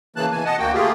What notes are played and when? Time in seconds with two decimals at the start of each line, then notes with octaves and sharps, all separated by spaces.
0.16 C#3 E3 A#3 A5 F#6
0.32 B2 E3 G#5
0.45 D#5 F#5 A5
0.59 D2 A#3 F#4 G5
0.74 A3 A#3 F4 G4 G#4